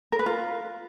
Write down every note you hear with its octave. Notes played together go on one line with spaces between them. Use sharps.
A#4
B4
F4